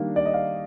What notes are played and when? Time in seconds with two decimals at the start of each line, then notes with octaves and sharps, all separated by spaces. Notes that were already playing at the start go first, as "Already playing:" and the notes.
Already playing: D#3 G3 A#3 D4 F5
0.16 D5
0.25 D#5
0.34 F5